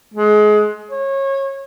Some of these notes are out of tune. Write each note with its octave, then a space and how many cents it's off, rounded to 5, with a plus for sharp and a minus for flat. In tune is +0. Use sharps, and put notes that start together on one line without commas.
G#3 +25
C#5 -25